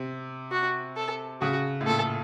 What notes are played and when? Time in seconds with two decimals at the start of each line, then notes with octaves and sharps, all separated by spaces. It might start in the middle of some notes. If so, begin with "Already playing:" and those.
Already playing: C3
0.51 F#4
0.96 A4
1.42 C#3 F#4
1.81 A2
1.86 A#2 A4